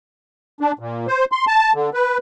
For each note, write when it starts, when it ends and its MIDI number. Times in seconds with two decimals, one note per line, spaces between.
0.60 0.72 62
0.79 1.07 46
1.08 1.25 72
1.32 1.45 84
1.47 1.72 81
1.74 1.90 50
1.94 2.18 71